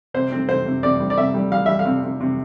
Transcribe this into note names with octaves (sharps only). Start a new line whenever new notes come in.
C3 C5
C4
C3 C5
C3
C3 D5
G3
D5
C3 E5
G3
G3 F5
G3 E5
F5
C3
C3
C3